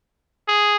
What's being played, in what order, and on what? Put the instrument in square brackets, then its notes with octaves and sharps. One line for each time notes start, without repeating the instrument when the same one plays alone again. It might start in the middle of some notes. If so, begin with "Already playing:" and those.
[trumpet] G#4